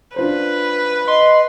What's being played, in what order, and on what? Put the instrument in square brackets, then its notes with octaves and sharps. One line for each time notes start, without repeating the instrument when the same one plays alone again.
[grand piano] D4 F4 C5 [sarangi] B4
[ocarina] D#5 [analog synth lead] C6